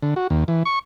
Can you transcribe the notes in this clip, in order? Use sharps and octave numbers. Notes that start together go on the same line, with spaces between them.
D3
F#4
D#2
E3
C#6